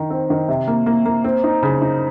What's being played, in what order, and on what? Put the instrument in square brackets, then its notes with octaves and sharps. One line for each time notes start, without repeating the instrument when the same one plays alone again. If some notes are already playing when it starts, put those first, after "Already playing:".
Already playing: [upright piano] D#3 D#4
C4
D#3
C3
A#3
A#3
A#3
C4
D#4
C#3
D#4